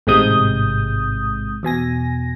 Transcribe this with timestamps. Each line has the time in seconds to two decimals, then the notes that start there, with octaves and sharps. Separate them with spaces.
0.07 A1 G#2 C3 G#3 D#6 G6
1.63 E2 B2 G#5 A#6